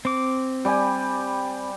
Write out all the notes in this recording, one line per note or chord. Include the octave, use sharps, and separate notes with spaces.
C4 D6
G3 G4 G#5